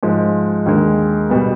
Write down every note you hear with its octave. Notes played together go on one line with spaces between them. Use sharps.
G#2 F3 G#3
D#2 D3 G#3
B2 G3 B3